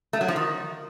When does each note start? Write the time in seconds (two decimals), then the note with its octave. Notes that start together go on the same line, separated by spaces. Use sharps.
0.13 A3
0.21 F#3
0.28 F3
0.36 D#3